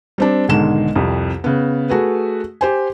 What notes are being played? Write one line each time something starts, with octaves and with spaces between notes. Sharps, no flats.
G3 C4 D4
B1 G#2 D3 D#3 G#3 E7
C2 F2
C#3 B3
A3 F#4 G#4 B4
G4 C5 G#5